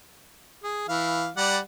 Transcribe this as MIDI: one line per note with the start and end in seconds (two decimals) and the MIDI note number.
0.63 0.88 68
0.88 1.28 52
0.88 1.28 77
1.37 1.58 55
1.37 1.58 74
1.37 1.58 78